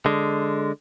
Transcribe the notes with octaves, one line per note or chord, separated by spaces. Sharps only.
D3 G#3